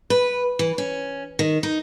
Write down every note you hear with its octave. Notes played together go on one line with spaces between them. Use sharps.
B4
E3
C#4
D#3
D#4